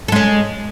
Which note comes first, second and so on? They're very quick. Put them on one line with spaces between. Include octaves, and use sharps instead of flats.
A4 G#3 C#4